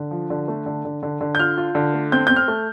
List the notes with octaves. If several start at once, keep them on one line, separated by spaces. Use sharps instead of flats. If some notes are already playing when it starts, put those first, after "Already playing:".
Already playing: D3
F3
D3
A3
D3
D3
D3
D3
G6
F4 F6
F4
D3
A3
C4 G6
C4 G6
F6
A3